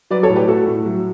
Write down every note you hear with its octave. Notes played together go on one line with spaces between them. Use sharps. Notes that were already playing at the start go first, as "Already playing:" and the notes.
F#3 B4 D5
A4 C#5
A2
G4 B4
A3 F#4 A4
A2
F#3